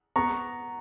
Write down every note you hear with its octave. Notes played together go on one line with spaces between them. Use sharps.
B3 A#5 C#6